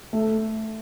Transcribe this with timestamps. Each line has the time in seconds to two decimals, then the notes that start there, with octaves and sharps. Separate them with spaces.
0.13 A3